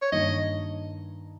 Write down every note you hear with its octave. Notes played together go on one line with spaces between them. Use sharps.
C#5
G2 D#3 A#3 D#4 D#5